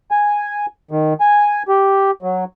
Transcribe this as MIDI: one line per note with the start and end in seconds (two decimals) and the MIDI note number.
0.11 0.66 80
0.91 1.13 51
1.20 1.63 80
1.68 2.11 67
2.22 2.44 54